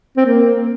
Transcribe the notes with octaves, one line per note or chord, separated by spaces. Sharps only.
C4
A#3